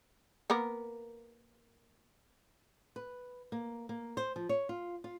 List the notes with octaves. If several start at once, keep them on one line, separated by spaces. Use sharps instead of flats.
A#3 B3 A#4
B4
A#3
A#3
C5
F3
C#5
F4
F4